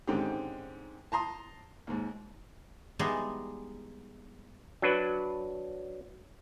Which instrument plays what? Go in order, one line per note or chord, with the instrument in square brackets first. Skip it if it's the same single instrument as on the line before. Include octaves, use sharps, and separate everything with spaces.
[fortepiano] G#2 D3 D#3 C4 C#4 G4
A5 A#5 C6 D#6
D#2 G#2
[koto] E3 G3 G#3 B3 D#4 G#4
[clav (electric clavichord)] F#3 D4 B4